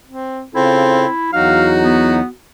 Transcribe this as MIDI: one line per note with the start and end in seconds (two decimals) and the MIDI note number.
0.07 0.44 60
0.55 1.05 49
0.55 1.09 60
0.55 1.28 64
0.55 1.05 65
0.55 1.05 69
1.33 2.20 40
1.33 2.20 54
1.33 2.20 63
1.33 2.34 66
1.33 1.71 77
1.85 2.27 59